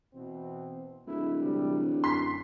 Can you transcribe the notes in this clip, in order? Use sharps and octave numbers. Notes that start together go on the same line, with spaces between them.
B2 E3 C4
D1 G#3 E4
C3 E3 G3
F#2 C6 B6